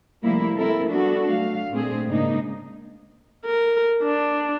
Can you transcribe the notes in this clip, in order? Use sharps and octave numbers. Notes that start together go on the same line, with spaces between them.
C3 F3 G3 A3 A#3 E4
C4 E4 A4 A#4
G3 B3 D4 F#4 A4
F#3 A3 F5
A#2 A3 C4 D4 G#4
G#2 C#3 A#3 D4 D#4
A#4
D4